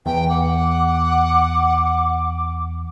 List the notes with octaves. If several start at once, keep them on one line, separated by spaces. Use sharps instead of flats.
E2 B4 G5
F#5 D6